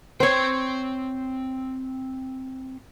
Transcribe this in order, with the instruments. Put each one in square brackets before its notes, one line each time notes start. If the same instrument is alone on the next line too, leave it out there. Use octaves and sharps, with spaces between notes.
[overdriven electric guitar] C4 G5 [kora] C5 C#5